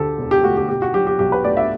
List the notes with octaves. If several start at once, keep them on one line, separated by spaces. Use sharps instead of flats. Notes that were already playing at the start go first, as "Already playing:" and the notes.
Already playing: D2 D3 G4 A4
E1
G4
A3 F#4
G4
B2 G4
F#4
F#3 G4
G4
B1 G4
B4
A3 D5
E5